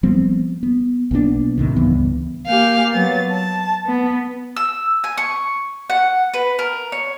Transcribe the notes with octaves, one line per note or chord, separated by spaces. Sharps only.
F3 G3 B3 C4
B3
B1 A#3 B3 D4
A2 C3 D#3
C#2 G2 E3 B3
A#3 G4 F5 G#5
F#3 B3 A6
A5
B3
E6
G#5
C#6
F#5
B4
A#4
C#5